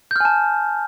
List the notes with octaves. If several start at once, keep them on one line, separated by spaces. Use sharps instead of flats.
G#5 A5 F6 G6